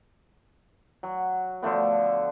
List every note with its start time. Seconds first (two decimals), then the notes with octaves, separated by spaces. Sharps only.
1.03 F#3
1.62 D3 F3 A3 B3